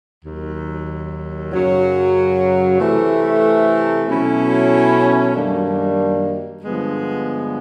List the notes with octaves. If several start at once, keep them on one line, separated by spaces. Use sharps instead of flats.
D#2 D#3 F#3
F#2 C#3 F#3
C3 E3 A3
B2 F#3 A3 C#4 E4
F#2 D#3 G3 A#3 D4
G2 D3 F3 G#3 B3